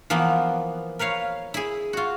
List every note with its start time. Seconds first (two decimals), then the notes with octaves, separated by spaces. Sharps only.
0.10 E3 F3 A#3 B3
0.99 A#4 B4 C#5 F5
1.54 E4 G#4
1.93 F4 F#4